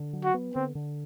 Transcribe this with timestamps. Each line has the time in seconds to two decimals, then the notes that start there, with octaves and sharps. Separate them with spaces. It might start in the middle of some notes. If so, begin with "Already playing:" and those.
Already playing: D3
0.13 F#3
0.24 F#4
0.34 B3
0.55 D3 C4
0.75 D3